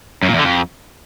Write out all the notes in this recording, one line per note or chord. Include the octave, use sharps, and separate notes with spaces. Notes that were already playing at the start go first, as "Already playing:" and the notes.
F#2
A#2
E2
D3
F2